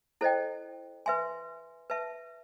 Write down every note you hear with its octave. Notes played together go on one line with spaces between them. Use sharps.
E4 A4 C5 D#5 G5
B4 E5 G#5 C6
B4 E5 A5